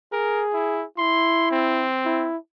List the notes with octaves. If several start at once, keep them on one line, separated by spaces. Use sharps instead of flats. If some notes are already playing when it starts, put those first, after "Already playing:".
G#4 A#4
E4
E4 C6
C4
E4